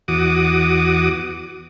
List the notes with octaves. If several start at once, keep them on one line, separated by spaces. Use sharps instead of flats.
E2 F#4 D6 D#6